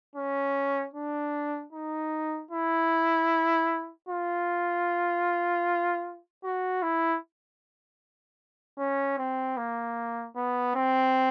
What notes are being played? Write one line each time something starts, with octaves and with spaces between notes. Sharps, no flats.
C#4
D4
D#4
E4
F4
F#4
E4
C#4
C4
A#3
B3
C4